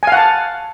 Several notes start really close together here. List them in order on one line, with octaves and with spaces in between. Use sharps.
G#5 F5 F#5 A5